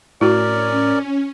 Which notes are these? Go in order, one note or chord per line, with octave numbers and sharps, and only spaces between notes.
A2 C#4 E4 F#4 A#4 D5